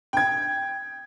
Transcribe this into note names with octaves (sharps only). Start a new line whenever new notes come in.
G5 G#6